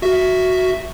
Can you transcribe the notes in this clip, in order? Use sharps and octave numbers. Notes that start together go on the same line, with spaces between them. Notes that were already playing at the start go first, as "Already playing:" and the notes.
F#4 E5